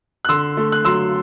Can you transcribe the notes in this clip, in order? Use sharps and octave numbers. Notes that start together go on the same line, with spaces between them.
F#6
D3 C6 E6
A3
F#6
F#3 C6 E6